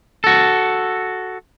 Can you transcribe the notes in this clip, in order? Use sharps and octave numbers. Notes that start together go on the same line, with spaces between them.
F#4 A4